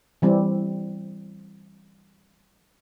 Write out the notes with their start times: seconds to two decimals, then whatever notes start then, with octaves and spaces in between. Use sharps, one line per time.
0.22 E3 G3 C4